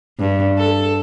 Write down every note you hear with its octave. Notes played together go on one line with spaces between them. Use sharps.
G2
A4